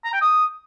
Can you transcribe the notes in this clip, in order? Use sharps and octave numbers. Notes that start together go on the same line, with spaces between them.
A#5
G5
D#6